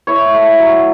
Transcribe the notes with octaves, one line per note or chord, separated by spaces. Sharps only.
E4 C#5
A3
F#3